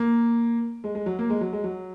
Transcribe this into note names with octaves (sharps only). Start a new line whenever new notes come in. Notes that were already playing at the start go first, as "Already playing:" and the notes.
Already playing: A#3
G#3
G#3
F#3
A#3
G#3
F#3
G#3
F#3